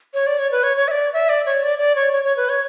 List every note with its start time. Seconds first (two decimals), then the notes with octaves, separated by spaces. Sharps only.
0.14 C#5
0.27 D5
0.39 C#5
0.52 B4
0.63 C#5
0.77 C#5
0.88 E5
0.91 D5
1.13 E5
1.29 D5
1.46 C#5
1.63 D5
1.79 D5
1.96 C#5
2.13 C#5
2.24 C#5
2.37 B4
2.49 C#5